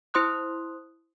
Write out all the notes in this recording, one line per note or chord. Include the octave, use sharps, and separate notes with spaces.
E4 C5 C6 D#6 F#6